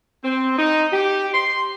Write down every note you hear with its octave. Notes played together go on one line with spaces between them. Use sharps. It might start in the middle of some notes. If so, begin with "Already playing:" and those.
C4
D#4
G4
C6